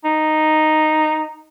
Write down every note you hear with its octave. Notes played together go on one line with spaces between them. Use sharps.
D#4